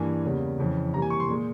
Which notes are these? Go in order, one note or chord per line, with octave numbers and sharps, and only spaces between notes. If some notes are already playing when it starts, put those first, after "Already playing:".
Already playing: G2 E3 A#3 G#5
E2 C#3 G3 A#3
F2 C#3 E3
C3 E3 G3 A#3 A#5
G#5
C#6
C6
A#2 G#3